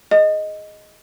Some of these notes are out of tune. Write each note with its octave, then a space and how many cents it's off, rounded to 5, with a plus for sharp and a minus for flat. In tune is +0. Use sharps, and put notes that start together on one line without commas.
G#4 +5 D#5 +0